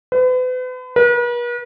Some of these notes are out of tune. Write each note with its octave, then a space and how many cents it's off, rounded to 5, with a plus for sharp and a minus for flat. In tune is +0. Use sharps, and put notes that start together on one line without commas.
B4 +40
B4 -45